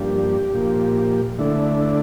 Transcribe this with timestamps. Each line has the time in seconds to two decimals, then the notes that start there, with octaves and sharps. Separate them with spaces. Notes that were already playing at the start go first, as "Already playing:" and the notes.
Already playing: G2 F3 A#3 D4 G4
0.54 A#2 F3 A#3
1.38 D3 A3 D4 E4